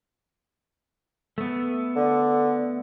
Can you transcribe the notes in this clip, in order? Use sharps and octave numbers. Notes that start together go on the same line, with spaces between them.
A3 B3
D3